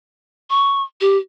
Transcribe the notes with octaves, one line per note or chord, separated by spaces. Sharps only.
C#6
G4